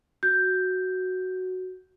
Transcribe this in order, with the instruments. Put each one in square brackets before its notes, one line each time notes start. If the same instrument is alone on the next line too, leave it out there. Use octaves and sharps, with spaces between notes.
[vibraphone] F#4 [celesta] G6